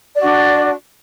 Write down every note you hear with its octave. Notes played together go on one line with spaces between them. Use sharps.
D4 F#4 D5